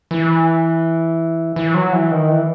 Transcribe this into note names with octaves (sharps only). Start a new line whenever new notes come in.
E3
E3
F#3
E3
D#3
E3